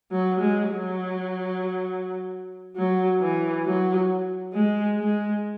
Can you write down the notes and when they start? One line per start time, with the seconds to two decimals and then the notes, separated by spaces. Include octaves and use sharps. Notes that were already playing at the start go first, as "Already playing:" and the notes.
0.11 F#3
0.40 G#3
0.70 F#3
2.76 F#3
3.20 E3
3.65 F#3
4.53 G#3
4.98 G#3